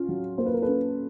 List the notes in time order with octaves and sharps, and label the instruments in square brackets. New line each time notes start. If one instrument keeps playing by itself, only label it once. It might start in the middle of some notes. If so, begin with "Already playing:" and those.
Already playing: [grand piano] C#4 F4
F#3
[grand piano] A#3 [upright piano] C5
[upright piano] B4
A#4
A4 B4
[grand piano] C#4